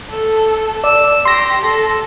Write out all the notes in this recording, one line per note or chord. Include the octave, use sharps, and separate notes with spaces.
A4
D5 E6
G4 C6 A#6
A4